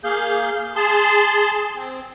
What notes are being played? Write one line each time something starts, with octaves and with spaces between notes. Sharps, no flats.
A#3 G#4 F5 G6
G#4 A5 C6
C4